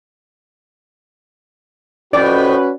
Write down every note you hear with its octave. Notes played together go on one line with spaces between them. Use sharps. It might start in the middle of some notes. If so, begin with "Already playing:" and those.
F2 A2 C#4 F#4 B4 D5